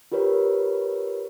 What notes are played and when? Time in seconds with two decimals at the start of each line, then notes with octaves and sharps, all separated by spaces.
0.12 F4 G4 A#4 B4 C#5